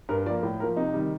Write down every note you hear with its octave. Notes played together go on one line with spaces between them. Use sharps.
G2 A#4
F3 A#3 D5
A2
F3 A#3 A#4
C3 D#4
D#3 G3